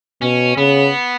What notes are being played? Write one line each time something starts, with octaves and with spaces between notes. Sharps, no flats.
B2 C#4
C#3 B3